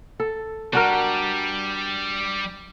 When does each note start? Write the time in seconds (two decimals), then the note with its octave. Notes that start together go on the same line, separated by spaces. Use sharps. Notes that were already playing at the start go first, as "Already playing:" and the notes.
0.20 A4
0.73 G3 D4 F#4 A#4